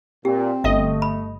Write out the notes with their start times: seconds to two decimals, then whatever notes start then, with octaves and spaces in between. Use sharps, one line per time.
0.25 A#2 C4 G4
0.64 G1 A3 D#5 E5
1.02 B5